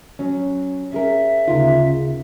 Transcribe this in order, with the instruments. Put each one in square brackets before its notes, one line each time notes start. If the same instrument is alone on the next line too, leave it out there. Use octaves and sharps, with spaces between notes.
[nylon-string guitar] F#3 C#4
[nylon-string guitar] C#4 G#4 A#4 [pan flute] E5
[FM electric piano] D2 D#4 [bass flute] C#3 [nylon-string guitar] F4 A#4